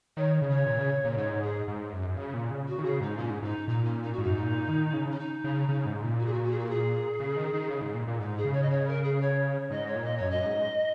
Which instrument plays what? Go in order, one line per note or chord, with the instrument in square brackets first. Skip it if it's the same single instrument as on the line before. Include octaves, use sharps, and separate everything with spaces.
[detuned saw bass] D#3 [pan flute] C#5
[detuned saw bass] C#3
[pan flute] C#5
[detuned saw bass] A#2
C#3
A#2
[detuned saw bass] G#2 [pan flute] C#5
[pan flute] G#4
[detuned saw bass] G#2
F#2
C#3
A#2
C#3
[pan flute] F#4
[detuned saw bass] D#3
[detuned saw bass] C#3 [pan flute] G#4
[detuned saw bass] G#2 [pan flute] D#4
[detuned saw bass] A#2 [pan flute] C#4
[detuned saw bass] G#2
[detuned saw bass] G#2 [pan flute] D#4
[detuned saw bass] A#2 [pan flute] D#4
[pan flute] C#4
D#4
F#4
[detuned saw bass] G#2
[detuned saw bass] F#2 [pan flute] D#4
[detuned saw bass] G#2
A#2
D#3
C#3
[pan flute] C#4
D#4
[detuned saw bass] C#3
C#3
G#2
A#2
[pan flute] F#4
G#4
F#4
F#4
G#4
F#4
A#4
G#4
[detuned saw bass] C#3
D#3
D#3
C#3
G#2
A#2
A#2
[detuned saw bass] G#2 [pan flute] D#4
[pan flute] G#4
[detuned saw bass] C#3
[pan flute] C#5
D#5
C#5
A#4
G#4
C#5
[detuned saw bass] G#2 [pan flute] D#5
[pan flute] C#5
[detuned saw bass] A#2
[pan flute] D#5
[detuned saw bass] F#2 [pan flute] C#5
[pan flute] D#5
[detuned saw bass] G#2